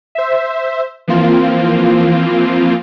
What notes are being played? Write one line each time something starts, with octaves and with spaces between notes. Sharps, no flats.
C5 E5
E3 F3 A#3 C4 F4